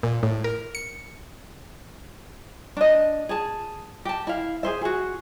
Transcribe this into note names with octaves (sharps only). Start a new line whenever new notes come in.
A#2
A2
A#4
C#7
D4 D#5
G#4 A5
G4 A5
E4 F5
G#4 C5 E5
F#4 G#4